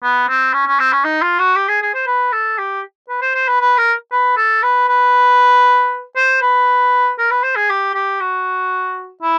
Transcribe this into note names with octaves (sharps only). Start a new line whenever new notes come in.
B3
C4
C#4
C#4
C4
C#4
D#4
F4
F#4
G4
G#4
G#4
C5
B4
A4
G4
B4
C5
C5
B4
B4
A#4
B4
A4
B4
B4
C5
B4
A#4
B4
C5
G#4
G4
G4
F#4
E4